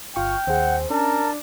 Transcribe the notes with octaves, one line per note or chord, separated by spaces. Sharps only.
G1 F4 G5 C#6 F6
D#2 C4 G#4 F#5
C#4 D4 A#4 A5